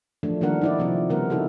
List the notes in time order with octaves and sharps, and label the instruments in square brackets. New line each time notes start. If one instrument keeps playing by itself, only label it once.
[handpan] E3 F3 A3 D4
D#3 G3 A#3 D4 A#4 F#5
D#4 E4 D5
C3 F3 C4
C#3 G3 B3 A#4 F#5
D#4 E4 F#4 A4